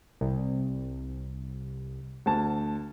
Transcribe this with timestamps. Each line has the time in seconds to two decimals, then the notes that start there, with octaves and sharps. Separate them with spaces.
0.21 C2
2.26 D2 A5